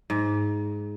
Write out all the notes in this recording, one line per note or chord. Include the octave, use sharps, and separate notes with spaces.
G#2